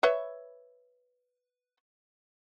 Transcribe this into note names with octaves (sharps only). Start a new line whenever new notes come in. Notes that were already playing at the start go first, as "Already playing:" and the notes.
B4 C#5 E5